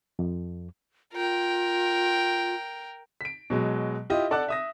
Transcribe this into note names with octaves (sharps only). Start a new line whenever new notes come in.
F2
F4 A#4 G5
B6 D7
B2 F#3 G#3
E4 F4 G4 D#5
A4 D5 F#5 A5 D6 F#6
E5 D#6 A#6